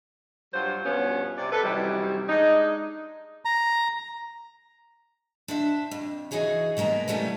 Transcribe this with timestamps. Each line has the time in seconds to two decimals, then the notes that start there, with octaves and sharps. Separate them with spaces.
0.54 G2 F#3 F4 C5
0.85 G2 B2 F3 B3 C#4
1.38 C3 D5
1.52 A4 B4
1.64 F#2 C3 D#3 E3 G3
2.28 G#3 D4 D#4
3.45 A#5
5.48 D4 C5 E5
5.91 F2
6.31 E3 D#4 F#4 G#4 C#5
6.77 B2 G#3 A#3 B3 A#5
7.08 E3 G3 A3 B3 C#4